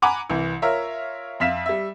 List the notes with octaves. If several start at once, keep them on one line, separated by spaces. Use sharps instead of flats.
F#5 G#5 A#5 B5 D6
C2 E3
F4 A#4 C#5 E5
F2 E5 F5 B6 E7
G3 E5